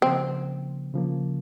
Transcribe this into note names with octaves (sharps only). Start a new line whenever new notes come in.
C#3 F3 A#3 C4
C#3 F3 A#3